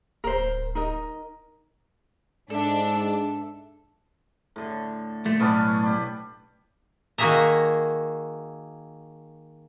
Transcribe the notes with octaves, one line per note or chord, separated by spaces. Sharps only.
D1 A#4 C5
D#4 A#4 D#5
G#2 D4 A4 E5
A2 D3
A#2 A3
B1 A2 B3 C#4 D4
D4 G4
D#3 A#3 F#4 G#4 E5 A#5